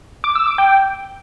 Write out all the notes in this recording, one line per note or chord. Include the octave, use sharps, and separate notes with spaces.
D6
E6
D6
G5